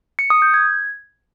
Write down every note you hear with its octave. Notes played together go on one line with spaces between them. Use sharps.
C#7
D#6
G6
G#6